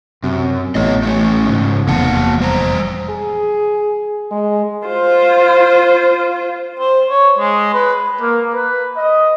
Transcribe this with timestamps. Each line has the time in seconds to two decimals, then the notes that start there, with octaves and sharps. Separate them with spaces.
0.23 F#2 C3
0.75 A1 A2 B3 C#5 D#5
1.03 A3 C#4
1.46 G#2 C#3
1.88 F1 E2 A#3 F#5 A5
2.40 G3 C5 A#5
3.10 G#4
4.31 G#3
4.87 F4 C5
6.80 C5
7.10 C#5
7.39 G#3
7.74 B4
8.20 A#3
8.53 B4
8.96 D#5